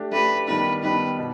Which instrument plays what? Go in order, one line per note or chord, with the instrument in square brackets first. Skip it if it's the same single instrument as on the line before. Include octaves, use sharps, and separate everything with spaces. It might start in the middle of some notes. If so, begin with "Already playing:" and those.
Already playing: [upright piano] A3 D4 G4
[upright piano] A3 D4 G4 [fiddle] B4
[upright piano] D#3 G3 B3 D4 [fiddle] B4
[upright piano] D#3 G3 B3 D4 [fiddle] B4
[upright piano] B2